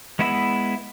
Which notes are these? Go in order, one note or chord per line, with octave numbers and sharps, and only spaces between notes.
G#3 B3 E4 E5 B5